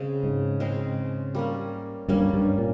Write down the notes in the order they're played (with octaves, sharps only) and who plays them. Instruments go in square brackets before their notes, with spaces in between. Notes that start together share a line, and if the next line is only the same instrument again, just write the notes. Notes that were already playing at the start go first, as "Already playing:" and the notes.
Already playing: [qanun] C#3 G#3 C4
[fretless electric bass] G#2
[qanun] C#3 G#3 C4
G3 A#3 C#4
[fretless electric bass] G2 [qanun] G3 A#3 C#4
[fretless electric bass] G2
A#2